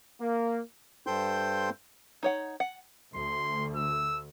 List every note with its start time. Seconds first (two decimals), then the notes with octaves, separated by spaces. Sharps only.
0.20 A#3
1.07 G2 A4 C5 G5 C6 G6
2.23 D#4 C#5 F#5
2.60 F#5
3.15 D2 C6
3.75 E6